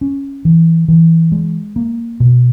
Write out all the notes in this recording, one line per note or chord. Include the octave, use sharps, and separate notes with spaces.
C#4
E3
E3
G#3
A#3
B2